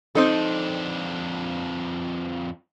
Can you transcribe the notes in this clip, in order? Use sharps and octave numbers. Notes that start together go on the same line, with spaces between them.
F2 C4 D4 D#4 A4